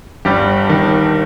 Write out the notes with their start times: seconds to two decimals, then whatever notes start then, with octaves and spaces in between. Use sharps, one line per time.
0.25 G1 G3 G4
0.69 D#3